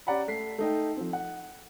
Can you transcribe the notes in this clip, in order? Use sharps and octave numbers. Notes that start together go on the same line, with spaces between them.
C#4 G4 D5 F#5 A#5 B5
A3 B6 C7
A3 D#4 G5
F3 C4
F#5